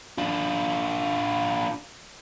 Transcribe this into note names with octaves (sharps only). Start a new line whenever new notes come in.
D4 F4